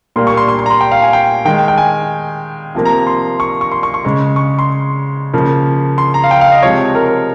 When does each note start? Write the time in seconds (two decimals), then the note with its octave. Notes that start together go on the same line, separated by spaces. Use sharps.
0.16 A#2 G3 A#3 C6
0.27 C#6
0.37 C6
0.48 C6
0.59 C6
0.66 A#5
0.70 C6
0.81 G5
0.92 F5
1.02 G#5
1.13 G5
1.45 D#3 G#3 G5
1.68 G5
1.78 G#5
2.75 C3 F3 A#3
2.86 A#5
3.07 C6
3.40 C#6
3.61 C#6
3.72 C6
3.83 C#6
3.94 C#6
4.05 C#3 G#3
4.36 C#6
4.59 C6
5.33 C#3 F3 A#3
5.98 C6
6.14 A#5
6.24 F5
6.31 G5
6.41 F5
6.52 D#5
6.63 C3 F3 G#3 C#5
6.95 A#4